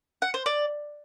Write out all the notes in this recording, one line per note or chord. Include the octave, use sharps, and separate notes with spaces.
F#5
C5
D5